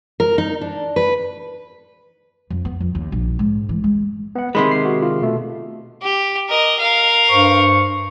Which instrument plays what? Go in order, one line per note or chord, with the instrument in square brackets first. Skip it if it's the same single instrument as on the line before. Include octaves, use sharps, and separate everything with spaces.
[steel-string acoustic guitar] A#4
D#4
D4
B4
[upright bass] F2
B3
F2
D#2
A#1
G#2
E3
G#3
[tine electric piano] B3 F#5
[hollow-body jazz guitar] C3 D#3 G#3 [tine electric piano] B5 C6 B6
[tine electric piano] C7
F#4
F4
B2 A3
[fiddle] G4
A#4 D#5
A#4 F5
[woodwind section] G2 C5 C#6